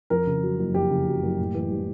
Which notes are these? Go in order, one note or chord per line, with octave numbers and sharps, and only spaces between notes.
F2 A#4
C#3
F#3
F#1
F2 G4
C#3
F#3
F#1
A2
E3
G3